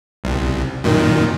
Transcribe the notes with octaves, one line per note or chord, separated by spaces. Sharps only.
C2
F#2 A#2 D#3